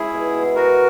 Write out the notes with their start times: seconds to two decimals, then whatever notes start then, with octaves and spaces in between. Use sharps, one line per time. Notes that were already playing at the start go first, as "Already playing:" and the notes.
Already playing: G#3 C#4 E4 G#4
0.13 B2
0.34 B2
0.56 B2 F#4 A#4